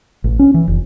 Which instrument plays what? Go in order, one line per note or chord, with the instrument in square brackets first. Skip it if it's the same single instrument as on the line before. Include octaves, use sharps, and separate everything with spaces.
[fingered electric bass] A1
C#4
E3
F1